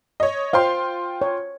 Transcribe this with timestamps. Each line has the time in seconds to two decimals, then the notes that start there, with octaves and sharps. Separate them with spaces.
0.20 C#5 D#5
0.53 F4 C5 F5 G5 C6
1.22 C#5